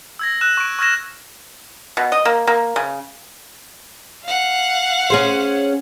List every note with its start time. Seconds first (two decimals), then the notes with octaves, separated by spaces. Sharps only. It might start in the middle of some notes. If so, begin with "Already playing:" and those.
0.19 E6 G#6 A#6
0.41 E6 F#6 E7
0.57 C#6 D7
0.79 C#6 E6 F6 G#6 A#6 E7
1.97 B2
2.12 D#5
2.25 A#3
2.47 A#3
2.76 C#3
4.24 F5 F#5
5.10 C#4 G#4 C5